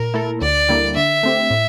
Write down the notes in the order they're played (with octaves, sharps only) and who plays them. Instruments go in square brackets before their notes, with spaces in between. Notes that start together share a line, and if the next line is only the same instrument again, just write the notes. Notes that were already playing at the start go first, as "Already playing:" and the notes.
Already playing: [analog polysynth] A#2 [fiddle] A#4
[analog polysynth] A3 E4 A4
[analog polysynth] D2 [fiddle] D5
[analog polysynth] D3 G3 A#3 E4
[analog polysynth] D3 [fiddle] E5
[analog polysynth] A3 C4 G4
A2